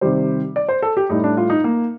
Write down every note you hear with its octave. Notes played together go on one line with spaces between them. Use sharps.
C3 D#3 G3 C5
D5
C5
A4
G4
A2 G3 D#4
D4
F4
D#4
A#3